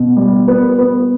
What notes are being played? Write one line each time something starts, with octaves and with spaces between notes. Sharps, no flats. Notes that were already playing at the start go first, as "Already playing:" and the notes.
Already playing: B2
G3
B3
B3